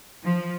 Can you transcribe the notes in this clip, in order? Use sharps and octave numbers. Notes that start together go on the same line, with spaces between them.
F3